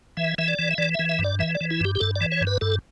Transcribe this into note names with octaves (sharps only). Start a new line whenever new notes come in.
E3 E5
E3 E5
D5
E3
E5
E3 D5
E3 E5
E5
G2
D5
E3 E5
D5
E3
E4
G2 G4
G4
G2 A4
D5
E3
C#5
G2
B4
G2 A4